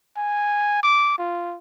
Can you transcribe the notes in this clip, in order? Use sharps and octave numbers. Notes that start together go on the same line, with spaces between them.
G#5
D6
F4